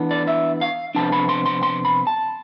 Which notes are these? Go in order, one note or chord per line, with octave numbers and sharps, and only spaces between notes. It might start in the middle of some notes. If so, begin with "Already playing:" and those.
Already playing: E3 B3 D4
D5
E5
F5
C3 F3 B3 D4 A5
B5
C6
C6
C6
B5
A5